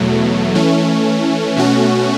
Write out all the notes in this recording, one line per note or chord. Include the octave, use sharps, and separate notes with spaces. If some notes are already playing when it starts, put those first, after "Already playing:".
Already playing: E2 B2 F#3 A3
E3 A3 C#4
B2 A3 C#4 F#4